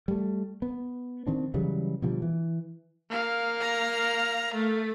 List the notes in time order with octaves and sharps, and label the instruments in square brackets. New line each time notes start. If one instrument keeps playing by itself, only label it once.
[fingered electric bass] G3 A3
B3
D#3 C4 D4
C#3 E3 F#3 G3
B2 D3 F3 G3
E3
[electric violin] A#3 F5
[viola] A#5
A3